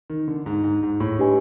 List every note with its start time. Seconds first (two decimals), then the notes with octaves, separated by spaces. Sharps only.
0.10 D#3
0.28 D3
0.46 G#2
0.64 G#2
0.83 G#2
1.00 A2
1.18 D4 G4 B4 D#5 G#5